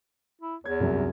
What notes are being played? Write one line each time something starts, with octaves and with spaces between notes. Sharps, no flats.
E4
E2 C#5 G#6
C2 F#2